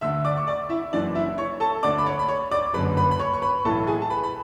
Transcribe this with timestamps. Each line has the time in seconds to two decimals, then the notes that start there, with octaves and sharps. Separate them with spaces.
0.01 D2 D3 E5 E6
0.25 D5 D6
0.37 C#6
0.47 D5 D6
0.69 E4 E5
0.93 F#1 F#2 E3 D4 D5
1.15 E4 E5
1.38 C#5 C#6
1.60 A4 A5
1.83 D2 D3 D5 D6
1.98 B5
2.06 C#5 C#6
2.19 B5
2.28 C#5 C#6
2.51 D5 D6
2.74 F#1 F#2 D3 B4 B5
2.97 B4 B5
3.11 B5
3.19 C#5 C#6
3.34 C#6
3.42 B4 B5
3.65 B1 A2 E3 A4 A5
3.87 G#4 G#5
4.02 A5
4.10 B4 B5
4.23 B5